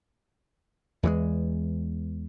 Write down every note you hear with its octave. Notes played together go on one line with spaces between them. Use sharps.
E2 E3 F#3 G#3